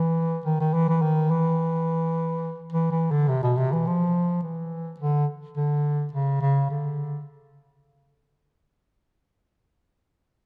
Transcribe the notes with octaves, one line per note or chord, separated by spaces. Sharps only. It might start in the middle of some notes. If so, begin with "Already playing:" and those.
Already playing: E3
D#3
D#3
E3
E3
D#3
E3
E3
E3
D3
C3
B2
C3
E3
F3
E3
D3
D3
C#3
C#3
D3